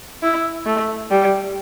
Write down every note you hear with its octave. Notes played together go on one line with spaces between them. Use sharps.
E4
A3
G3